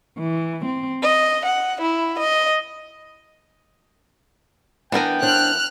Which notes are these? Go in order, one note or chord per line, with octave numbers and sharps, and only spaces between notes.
E3
C4
D#5
F#5
E4
D#5
E3 B3 D4 A#4 E5 G5 G#5
D4 C5 F6 F#6